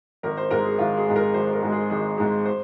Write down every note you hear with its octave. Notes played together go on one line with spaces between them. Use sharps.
G#1 A#4
C5
G#2 G#3 A#4
G#4
G#1 F4
G#4
G#2 G#3
A#4
G#1 C5
A#4
G#2 G#3
G#4
G#1 G#4
G#2 G#3
C5